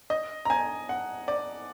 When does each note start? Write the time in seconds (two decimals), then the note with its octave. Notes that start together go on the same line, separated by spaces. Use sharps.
0.10 D#5
0.45 A#5
0.50 G#5
0.89 F#5
1.28 D5